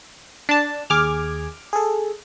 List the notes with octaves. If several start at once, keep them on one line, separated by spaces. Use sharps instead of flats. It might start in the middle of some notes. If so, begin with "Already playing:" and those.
D4 A5
D#2 G#4 D6 F6 G#6
G#4 A4